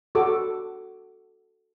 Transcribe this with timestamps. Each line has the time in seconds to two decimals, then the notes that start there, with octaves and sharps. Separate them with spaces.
0.15 F#4 A4 D6